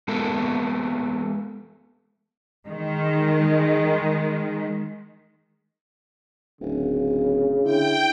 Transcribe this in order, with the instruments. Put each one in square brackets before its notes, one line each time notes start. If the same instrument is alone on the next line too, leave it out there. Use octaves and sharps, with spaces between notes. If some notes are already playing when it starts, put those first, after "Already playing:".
[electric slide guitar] G#3 B3 A4 A#4
[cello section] D#3 G#3
[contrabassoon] D1 [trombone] C#3
[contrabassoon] D3 [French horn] E4 [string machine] G5